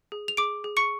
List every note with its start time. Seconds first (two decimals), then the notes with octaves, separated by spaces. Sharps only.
0.12 G#4
0.28 F7
0.37 G#4 D6 D7
0.64 G#4
0.77 C#6 C#7